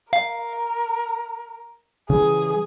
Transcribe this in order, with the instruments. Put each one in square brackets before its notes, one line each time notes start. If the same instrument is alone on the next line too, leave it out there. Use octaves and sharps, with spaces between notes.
[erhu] A#4 [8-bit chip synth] F5
[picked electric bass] C#3 E3 G3 [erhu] G#4